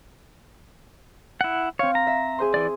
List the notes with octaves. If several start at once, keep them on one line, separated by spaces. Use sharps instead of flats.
E4 F#5
C4 C#5 F5
A#5
E5
G#4 C5 C6
E3 D5